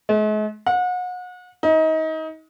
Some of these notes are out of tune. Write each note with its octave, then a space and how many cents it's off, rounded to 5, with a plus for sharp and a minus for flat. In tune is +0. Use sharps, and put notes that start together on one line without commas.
G#3 +45
F#5 -35
D#4 +30